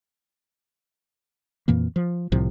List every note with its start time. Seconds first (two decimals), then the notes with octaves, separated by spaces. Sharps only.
1.68 F2 A#2 E3 A#3
1.96 F3
2.32 C2 A2 C3 F3